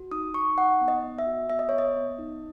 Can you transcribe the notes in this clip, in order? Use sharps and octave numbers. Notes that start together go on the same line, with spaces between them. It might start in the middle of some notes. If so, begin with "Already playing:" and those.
Already playing: F#4
D#4 D#6
D#4 C#6
D#4 F#5
B3
D#5
B3
E5
F#4
B3 E5
D#5
B3 C#5
D#5
B3
D#4